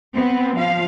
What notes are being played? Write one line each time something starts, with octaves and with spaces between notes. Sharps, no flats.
B3 C4
F3 F5